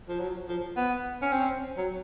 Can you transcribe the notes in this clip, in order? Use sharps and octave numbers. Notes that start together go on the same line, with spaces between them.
F3
F#3
F3
B3
C#4
C4
F#3